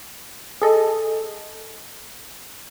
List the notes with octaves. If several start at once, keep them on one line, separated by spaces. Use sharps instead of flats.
G#4 A4 D#5